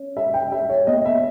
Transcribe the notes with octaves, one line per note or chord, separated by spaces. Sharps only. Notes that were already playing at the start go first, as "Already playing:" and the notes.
Already playing: C#4
G3 E5
G5
G3 E5
C#5
B3 D#5
E5